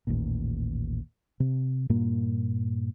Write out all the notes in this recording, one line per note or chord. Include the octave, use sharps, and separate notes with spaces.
A1 D#2 A#2
C3
G2 A#2 A#3